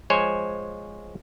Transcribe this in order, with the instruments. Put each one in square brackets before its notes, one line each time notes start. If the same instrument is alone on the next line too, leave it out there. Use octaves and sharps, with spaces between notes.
[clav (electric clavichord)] F3 G#3 C5 C#5 G#5